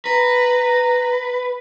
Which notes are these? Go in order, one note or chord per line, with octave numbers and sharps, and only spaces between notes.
B4 A#5